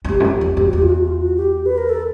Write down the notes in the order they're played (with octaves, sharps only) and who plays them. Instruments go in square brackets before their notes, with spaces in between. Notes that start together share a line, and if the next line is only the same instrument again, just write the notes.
[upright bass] F2
[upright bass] E2 [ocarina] G4
[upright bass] F#2
F2
E2
F2
[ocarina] F#4
[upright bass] E2 [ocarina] G4
[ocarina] F4
F#4
F4
F#4
G4
B4
A#4
A4